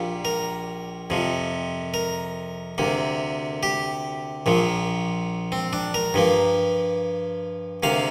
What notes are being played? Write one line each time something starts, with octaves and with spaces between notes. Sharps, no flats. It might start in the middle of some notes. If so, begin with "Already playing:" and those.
Already playing: A#1 A#2 G3 A#3
A#4
F2 C3 F3
A#4
D2 C3 A#3
G4
A#1 A#2 F3
C4
D4
A#4
G2 F3 A#3
D2 C3 A#3 F5